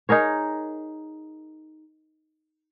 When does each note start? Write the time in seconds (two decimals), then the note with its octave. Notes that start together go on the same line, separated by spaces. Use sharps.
0.09 D#4 G#4 A#4 C#5